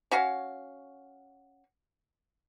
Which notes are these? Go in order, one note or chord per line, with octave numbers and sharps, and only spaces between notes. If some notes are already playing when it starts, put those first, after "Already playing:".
C#4 F#4 F5